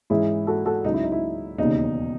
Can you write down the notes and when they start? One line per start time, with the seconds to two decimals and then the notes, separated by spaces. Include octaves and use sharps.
0.10 G#2 E3 G#3 C#4 E4 G#4
0.47 F#4 A4
0.65 F#4 A4
0.84 C#2 C#3 F#3 D#4
0.94 E4
1.03 D#4
1.12 E4
1.58 E1 D#2 C#3 D#4